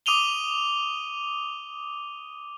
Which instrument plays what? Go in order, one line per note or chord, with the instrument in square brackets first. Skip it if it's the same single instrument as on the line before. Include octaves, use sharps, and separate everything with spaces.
[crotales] D6 D#6 D#7 F7 G7